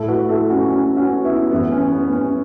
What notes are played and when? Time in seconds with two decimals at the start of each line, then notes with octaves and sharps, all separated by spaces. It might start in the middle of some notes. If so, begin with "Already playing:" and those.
Already playing: A2 A3 E4 A4
0.08 F#4 B4
0.29 E4 A4
0.50 C#4 F#4
0.70 C#4
0.97 C#4 F#4
1.24 B3 E4
1.51 F#2 E3 A3 B3 E4
1.72 C#4
1.92 B3
2.13 C#4